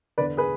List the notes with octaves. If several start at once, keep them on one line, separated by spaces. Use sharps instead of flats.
E2 D3 B4 D5
G#4 B4